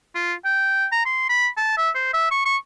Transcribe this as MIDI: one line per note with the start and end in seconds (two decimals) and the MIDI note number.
0.15 0.33 65
0.45 0.85 79
0.92 1.01 82
1.05 1.27 84
1.29 1.48 83
1.57 1.76 81
1.77 1.90 76
1.95 2.11 72
2.14 2.30 76
2.31 2.43 85
2.45 2.56 85